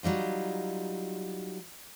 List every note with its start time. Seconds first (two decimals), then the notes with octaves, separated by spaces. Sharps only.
0.03 F#3 G3 D#4 F4